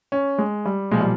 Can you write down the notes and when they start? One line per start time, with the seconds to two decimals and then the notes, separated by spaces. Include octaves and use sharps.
0.12 C#4
0.38 G#3
0.65 G3
0.91 B1 A#2 F3 G#3
1.01 G3